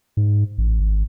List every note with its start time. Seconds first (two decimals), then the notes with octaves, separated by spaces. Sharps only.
0.17 G#2
0.58 A1
0.80 G#1